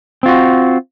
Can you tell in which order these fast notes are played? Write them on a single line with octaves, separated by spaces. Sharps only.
C4 F4 F#4